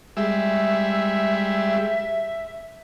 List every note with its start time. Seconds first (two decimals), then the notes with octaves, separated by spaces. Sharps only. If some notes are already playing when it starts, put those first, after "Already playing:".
0.17 G3 G#3 E5 E6